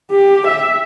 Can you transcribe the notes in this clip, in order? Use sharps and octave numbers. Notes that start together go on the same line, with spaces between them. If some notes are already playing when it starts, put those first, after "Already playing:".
G4
E5